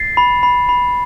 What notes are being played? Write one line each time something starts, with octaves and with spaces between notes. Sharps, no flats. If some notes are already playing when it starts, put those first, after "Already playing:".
Already playing: A6 C7
B5
B5
B5